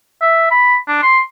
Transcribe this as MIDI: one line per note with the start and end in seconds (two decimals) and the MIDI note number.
0.21 0.50 76
0.51 0.76 83
0.88 0.98 62
1.03 1.20 84